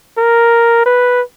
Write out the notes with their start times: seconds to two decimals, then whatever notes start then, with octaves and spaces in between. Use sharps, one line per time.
0.18 A#4
0.86 B4